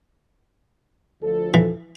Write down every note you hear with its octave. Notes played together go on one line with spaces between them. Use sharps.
D2 F3 A4
E3